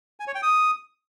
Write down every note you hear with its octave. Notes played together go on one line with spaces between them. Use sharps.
G#5
C#5
G5
D#6